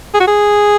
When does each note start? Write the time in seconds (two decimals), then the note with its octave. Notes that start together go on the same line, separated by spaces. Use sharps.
0.14 G#4
0.20 F#4
0.28 G#4